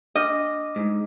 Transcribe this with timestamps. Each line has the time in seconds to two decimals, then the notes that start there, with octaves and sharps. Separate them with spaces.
0.15 D4 D#5 D6 F6
0.76 G#2